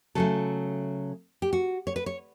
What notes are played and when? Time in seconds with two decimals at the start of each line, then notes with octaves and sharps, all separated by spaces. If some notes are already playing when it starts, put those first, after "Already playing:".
0.15 C#3 F#3 A3 A4
1.42 G4
1.53 F#4
1.87 C#5
1.96 B4
2.06 C#5